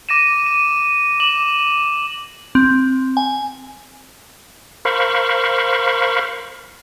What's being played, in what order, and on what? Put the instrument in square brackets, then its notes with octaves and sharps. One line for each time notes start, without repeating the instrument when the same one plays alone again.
[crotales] D6 A#6 D#7 E7
D#7
D6 E7 F#7
[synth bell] C4
G#5
[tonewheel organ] A#4 C5 F5 B5 C#6